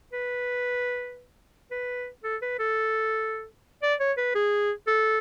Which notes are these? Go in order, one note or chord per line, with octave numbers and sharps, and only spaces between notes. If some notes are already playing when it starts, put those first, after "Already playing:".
B4
B4
A4
B4
A4
D5
C#5
B4
G#4
A4